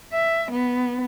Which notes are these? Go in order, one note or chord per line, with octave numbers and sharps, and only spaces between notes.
E5
B3